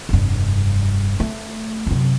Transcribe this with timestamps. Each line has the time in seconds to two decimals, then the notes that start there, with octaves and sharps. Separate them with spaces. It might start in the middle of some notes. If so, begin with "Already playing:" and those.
0.09 F1 G2
1.20 A3
1.87 F#2 C3